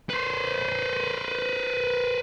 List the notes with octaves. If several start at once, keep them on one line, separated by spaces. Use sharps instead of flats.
B4 C5